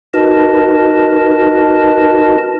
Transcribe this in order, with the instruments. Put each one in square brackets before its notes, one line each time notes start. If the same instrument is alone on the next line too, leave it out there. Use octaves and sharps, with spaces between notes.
[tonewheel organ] D#4 F#4 B4 [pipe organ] A#4 D#5 A5